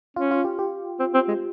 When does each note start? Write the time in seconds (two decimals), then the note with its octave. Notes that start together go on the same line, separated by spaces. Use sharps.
0.16 C#4 F4
0.31 F4
0.45 G4
0.59 G4
1.00 C4
1.14 C4
1.28 G#3